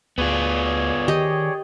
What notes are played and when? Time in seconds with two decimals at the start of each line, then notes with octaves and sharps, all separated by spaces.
0.18 D2 B3 F4 G#4 C#5 D5
1.08 D#3 G4 D#5